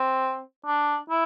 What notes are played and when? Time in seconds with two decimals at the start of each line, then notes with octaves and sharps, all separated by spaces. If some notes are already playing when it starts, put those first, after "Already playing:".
Already playing: C4
0.66 D4
1.10 E4